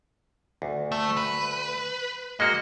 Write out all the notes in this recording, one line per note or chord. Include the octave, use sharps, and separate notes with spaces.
D2
A3
B4
G#3 A#3 F#4 D#5